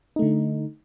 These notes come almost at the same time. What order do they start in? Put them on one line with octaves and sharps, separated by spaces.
D#4 A3 D3